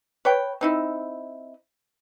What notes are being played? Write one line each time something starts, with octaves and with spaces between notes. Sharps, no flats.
B4 C#5 G5
C4 D#4 E4